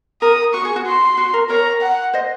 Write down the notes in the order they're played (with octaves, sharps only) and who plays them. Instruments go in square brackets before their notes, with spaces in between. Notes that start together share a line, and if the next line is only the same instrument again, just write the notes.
[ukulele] A#4 [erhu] D#6
[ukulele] F#4 [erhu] C#6
[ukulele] G#4
F#4
[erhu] C6
[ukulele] F#4
A#4
[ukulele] A#4 C#5 [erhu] A#5
[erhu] F#5
[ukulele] C5 D#5